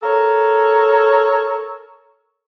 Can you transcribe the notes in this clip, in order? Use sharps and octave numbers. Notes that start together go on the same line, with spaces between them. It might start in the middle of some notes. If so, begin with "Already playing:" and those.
A4 A#4 C#5